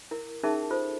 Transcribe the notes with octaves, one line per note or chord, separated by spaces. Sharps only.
E4 A#4
C#4 D#4 G#4 A#4 E5 A5
F4 A4 C5